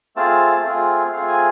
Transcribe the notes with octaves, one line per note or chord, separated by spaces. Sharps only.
A3 C4 F4 G#4 A5
A3 C4 F4 G#4
A3 C4 F4 G#4 F5
G#5